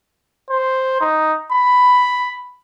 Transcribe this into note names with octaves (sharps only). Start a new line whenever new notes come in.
C5
D#4
B5